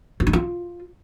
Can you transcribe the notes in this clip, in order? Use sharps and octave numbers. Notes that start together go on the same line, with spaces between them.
F4
D#4
F4